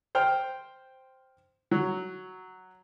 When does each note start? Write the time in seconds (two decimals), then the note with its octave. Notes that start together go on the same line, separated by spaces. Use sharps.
0.15 C5 G5 F6
1.71 F#3